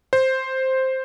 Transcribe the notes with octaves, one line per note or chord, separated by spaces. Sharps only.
C5